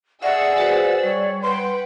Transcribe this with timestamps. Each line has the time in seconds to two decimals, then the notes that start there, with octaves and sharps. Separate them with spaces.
0.23 G#4 D5 E5 F#5 E6
0.58 F#4 B4 C5
1.03 G3 C#5
1.42 B4 F#5 G5 C6